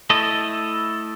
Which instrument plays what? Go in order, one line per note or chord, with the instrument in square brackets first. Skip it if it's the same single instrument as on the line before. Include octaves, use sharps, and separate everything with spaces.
[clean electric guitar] A3 E4 A4 D#5